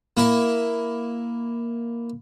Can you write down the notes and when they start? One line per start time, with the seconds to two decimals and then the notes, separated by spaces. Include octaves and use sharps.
0.17 A#3 E4 E5